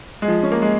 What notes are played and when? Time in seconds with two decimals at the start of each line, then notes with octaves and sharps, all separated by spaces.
0.22 G#3
0.28 F3
0.43 C#4
0.52 A#3
0.62 G#3